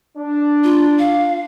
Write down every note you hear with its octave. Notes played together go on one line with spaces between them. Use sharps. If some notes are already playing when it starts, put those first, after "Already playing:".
D4
F4
F5